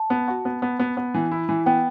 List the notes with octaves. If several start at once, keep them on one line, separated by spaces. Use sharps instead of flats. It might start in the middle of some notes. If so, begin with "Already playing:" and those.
Already playing: A5
B3
F#4
B3
B3
B3
B3
E3
E4
E3
B3 G5